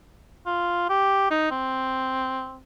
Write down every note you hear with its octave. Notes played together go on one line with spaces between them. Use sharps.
F4
G4
D#4
C4